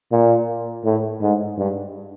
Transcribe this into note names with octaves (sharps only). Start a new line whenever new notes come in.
A#2
A2
G#2
G2